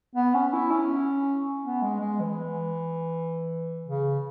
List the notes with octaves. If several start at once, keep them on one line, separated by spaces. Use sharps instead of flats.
B3
C#4
E4
C#4
B3
G#3
G#3
E3
C#3